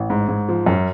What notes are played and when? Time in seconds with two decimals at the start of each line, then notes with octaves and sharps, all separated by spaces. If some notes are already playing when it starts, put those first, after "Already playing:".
Already playing: A1
0.10 G#2
0.28 G#2
0.49 F3
0.66 F#2